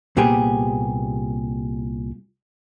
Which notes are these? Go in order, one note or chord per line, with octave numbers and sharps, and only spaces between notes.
C2 A#2 G3 B3 G4 G#4